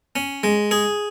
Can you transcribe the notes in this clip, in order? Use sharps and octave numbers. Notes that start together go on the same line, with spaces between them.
C#4
G#3
G#4